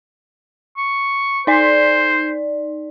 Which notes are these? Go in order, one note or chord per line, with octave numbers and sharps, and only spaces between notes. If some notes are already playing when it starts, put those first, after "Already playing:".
C#6
D#4 C5 D5